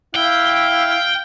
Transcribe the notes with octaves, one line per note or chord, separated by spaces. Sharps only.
E4 F5 G5